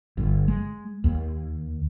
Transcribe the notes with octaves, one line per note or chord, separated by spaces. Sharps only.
G1
G#3
D#2